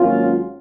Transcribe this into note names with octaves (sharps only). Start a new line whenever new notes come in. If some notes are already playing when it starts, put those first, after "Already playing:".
Already playing: G#1 G#2 F#3 A#3 C#4 F4